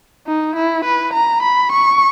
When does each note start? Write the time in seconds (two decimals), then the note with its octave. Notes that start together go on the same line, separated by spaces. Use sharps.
0.27 D#4
0.56 E4
0.85 B4
1.14 A#5
1.43 B5
1.72 C#6